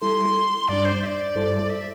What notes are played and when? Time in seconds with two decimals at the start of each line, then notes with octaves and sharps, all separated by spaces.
0.01 G3 E4 A4 C6
0.68 G2 G3 D4 D5
0.85 C5
1.02 E5
1.06 D5
1.35 G2 G3 E4 A4 C5
1.70 E5